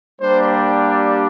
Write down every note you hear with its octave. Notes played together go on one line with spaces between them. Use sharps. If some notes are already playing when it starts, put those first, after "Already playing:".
G3 A#3 D4 G4 C5